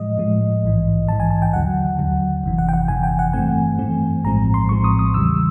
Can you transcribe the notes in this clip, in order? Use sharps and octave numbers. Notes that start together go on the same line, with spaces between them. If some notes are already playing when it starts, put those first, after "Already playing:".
Already playing: A2 F3 G#3 D#5
A2 F3 G#3
A#1 G#2 E3
A#1 G#2 E3 A5
G#5
A5
G5
D#2 D3 F#3 F#5
D#2 D3 F#3
G1 F2 C3 E3
F#5
G5
F#5
G1 F2 C3 E3 G#5
G5
F#5
G2 E3 A3 C4 G#5
G2 E3 A3 C4
A#1 A2 F3 G#3 C4 A#5
C6
A#1 A2 F3 G#3 C4 C#6
D#6
D#6
E2 C#3 E3 G3 E6